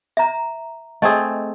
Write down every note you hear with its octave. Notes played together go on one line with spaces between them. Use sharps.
E5 A#5
A3 C4 G#4 D#5